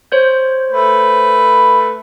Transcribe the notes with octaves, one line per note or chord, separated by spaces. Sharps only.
C5 C#5 G6
A3 B4